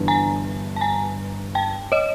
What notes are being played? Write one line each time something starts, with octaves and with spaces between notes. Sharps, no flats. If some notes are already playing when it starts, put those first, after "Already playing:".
Already playing: G1 G2 E3
G#5 A#5
A5
G#5 A#5
G5 A5
C#5 D#5